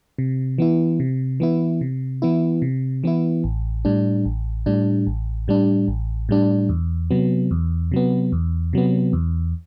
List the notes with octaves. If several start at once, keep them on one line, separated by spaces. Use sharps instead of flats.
C3
E3 B3 E4
C3
E3 B3 E4
C3
E3 B3 E4
C3
E3 B3 E4
A1
A2 G3 D4
A1
A2 G3 D4
A1
A2 G3 D4
A1
A2 G3 D4
E2
C3 F#3 B3
E2
C3 F#3 B3
E2
C3 F#3 B3
E2